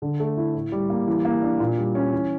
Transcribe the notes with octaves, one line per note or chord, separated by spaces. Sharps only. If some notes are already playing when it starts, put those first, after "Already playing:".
D3
A3
E4
A2
G3
A#3
E3
A#3
D4
A#2
G3
C#4
E3